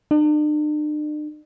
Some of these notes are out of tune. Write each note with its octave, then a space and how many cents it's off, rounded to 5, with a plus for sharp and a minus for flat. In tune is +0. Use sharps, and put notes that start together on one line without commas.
D4 +45